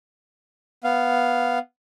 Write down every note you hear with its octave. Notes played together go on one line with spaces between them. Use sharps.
B3 F5